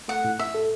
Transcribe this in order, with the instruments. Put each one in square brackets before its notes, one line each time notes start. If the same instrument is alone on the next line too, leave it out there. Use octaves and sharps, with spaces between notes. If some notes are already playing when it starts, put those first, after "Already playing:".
[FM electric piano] A3 [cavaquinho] F#5
[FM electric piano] A2
[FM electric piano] A2 [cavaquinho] E5
[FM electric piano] A4